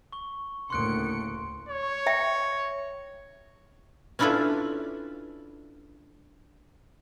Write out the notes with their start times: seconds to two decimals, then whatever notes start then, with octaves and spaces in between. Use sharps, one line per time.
0.12 C#6 G7
0.70 D2 A2 C#3 A#3 C6 F#6 C#7 D7
1.69 C#5
2.06 E5 G5
4.19 C#4 D4 E4 F4 A4 B4